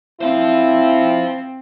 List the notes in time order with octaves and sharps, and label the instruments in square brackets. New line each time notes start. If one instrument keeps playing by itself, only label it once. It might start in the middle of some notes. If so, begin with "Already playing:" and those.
[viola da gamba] C4 [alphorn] E4 [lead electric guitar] C5 F5